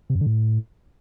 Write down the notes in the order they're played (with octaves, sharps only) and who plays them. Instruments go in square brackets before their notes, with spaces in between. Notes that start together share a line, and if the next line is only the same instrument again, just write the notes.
[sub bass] C3
F#2
D3
A2